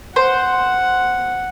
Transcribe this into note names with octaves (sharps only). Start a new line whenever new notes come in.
C5 F#5